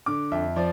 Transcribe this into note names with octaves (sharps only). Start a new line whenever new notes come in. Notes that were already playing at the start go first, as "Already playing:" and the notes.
D3 D6
F2 E5
F3 D5